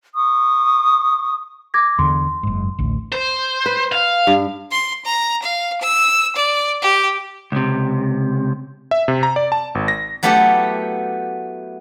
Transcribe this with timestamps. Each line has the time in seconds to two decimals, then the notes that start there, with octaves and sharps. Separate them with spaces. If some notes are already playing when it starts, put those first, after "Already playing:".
0.16 C#6 D#6
1.74 D6 G#6 A#6
1.99 E2 D3 C6
2.43 F#1 G#2
2.79 A1 D2
3.13 C5
3.66 B4
3.93 F5
4.27 G2
4.71 C6
5.05 A#5
5.42 F5
5.81 E6
6.36 D5
6.82 G4
7.52 C#2 C3
8.91 E5
9.08 C3
9.23 A#5
9.36 D5
9.52 A5
9.75 G#1
9.88 A#6
10.23 F#3 A3 B3 E4 G4